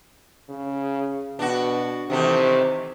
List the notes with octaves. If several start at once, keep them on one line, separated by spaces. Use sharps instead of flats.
C#3
B2 D4 F#4
C3 D#3 E3 A3